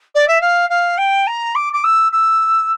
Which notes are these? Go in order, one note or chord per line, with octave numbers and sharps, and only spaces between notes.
D5
E5
F5
F5
G5
A#5
D6
D6
E6
E6